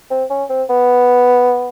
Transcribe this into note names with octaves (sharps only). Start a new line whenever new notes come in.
C4
C#4
C4
B3